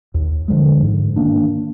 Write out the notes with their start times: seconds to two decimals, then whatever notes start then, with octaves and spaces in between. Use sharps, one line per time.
0.14 D#2
0.48 D3 F3 G#3
0.82 G#2
1.16 D#3 A#3 D4